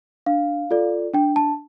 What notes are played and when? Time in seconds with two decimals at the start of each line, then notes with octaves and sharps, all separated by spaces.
0.26 D4 F5
0.71 F4 A4 D5
1.13 D4 G5
1.36 A5